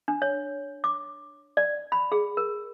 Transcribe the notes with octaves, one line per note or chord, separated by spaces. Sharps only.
D4
C#5
D6
D5
B5
G#4
A#4